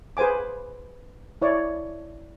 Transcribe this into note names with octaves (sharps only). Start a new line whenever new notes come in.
G#4 B4 C5 G#5 D6
E4 C#5 D5